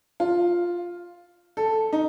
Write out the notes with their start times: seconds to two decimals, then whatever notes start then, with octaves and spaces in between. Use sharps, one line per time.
0.20 F4
1.57 A4
1.93 D#4